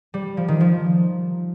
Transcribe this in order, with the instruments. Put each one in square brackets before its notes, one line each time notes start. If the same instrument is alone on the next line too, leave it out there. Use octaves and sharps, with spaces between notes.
[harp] G3
F3
D#3
F3